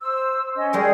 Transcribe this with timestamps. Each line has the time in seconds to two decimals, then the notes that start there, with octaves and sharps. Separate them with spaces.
0.01 C5 E6
0.56 C#4 D#5
0.73 G3 G#3 G#4 A#4